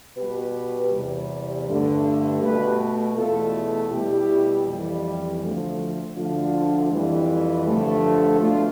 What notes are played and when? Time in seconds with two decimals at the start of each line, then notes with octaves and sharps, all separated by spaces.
0.17 B2 G3 G4 B4
0.92 E2 C3 G3
1.68 G2 D3 A3
2.42 B2 A3 G4 B4
3.16 E2 B2 A3 F4 A4
3.91 B2 G3 E4 G4
4.66 F2 E3 G3
5.41 D2 D3 F3 A3
6.16 D2 D3 F3 A3 D4 F4
6.91 F2 E3 G3
7.66 G2 D3 F3 A3
8.40 B2 A3 D4 F4